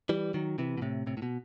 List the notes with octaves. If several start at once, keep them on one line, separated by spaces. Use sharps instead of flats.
E3 G3
D#3 F#3
C3 E3
B2
A2 C3
A2 C3
A2
B2